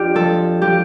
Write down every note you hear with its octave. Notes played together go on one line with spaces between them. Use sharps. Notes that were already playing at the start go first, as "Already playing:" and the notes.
Already playing: F2 D4 F4 G4
F3 A4
F3 G4